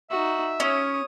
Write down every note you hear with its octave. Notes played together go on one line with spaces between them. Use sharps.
D#4 F#4 E5
C#4 C#5 D#6